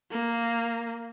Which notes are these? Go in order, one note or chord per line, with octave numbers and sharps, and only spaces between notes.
A#3